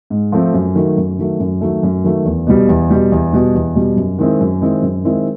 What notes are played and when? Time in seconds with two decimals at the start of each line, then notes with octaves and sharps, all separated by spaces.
0.10 G#2
0.32 F3 A3 C4
0.54 F#2
0.75 D#3 F#3 A3
0.97 F#2
1.19 D#3 F#3 A3
1.40 F#2
1.61 D#3 F#3 A3
1.83 F#2
2.04 D#3 F#3 A3
2.25 E2
2.47 B2 G3
2.69 E2
2.90 B2 G3
3.12 E2
3.33 B2 G3
3.55 E2
3.75 B2 G3
3.96 F#2
4.18 D#3 G#3 C4 E4
4.40 F#2
4.61 D#3 G#3 C4 E4
4.82 F#2
5.04 D#3 G#3 C4 E4